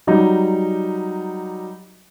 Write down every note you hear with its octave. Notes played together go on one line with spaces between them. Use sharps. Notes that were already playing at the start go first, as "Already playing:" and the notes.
F#3 G3 D#4